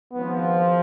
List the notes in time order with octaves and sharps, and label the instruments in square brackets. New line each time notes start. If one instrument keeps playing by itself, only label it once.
[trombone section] G#1 G#2 F3 C4 [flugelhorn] B3